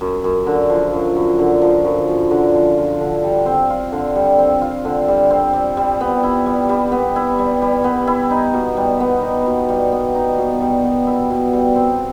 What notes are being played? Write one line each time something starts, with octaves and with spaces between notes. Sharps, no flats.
F#2
F#2
D3
F3
F#2
F#2
D3
F3
F#2
F#2
D3
F3
F4
D3
G3
C4
F4
D3
G3
C4
F4
D3
G3
C4
G3
G3
B3
E4
G3
G3
B3
E4
G3
G3
B3
E4
D#4
B2
G3
B3
D#4
B2
G3
B3
D#4
B2
G3
B3
E4
B2
G3
C4